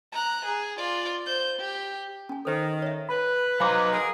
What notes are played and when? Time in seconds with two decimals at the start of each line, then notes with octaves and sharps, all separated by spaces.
0.12 A#5 F#6
0.45 G#4
0.77 F4 D5
1.26 C5 G6
1.59 G4
2.29 C#4 G#5
2.45 D#3 A4 C5
2.82 C#5 E5
3.09 B4 B5
3.60 F#3 D#4 C5 F5 G#5 B5 C6 D6
3.92 G#4 A#4